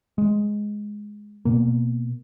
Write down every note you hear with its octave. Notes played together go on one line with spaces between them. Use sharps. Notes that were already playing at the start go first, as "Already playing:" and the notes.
G#3
B2 A#3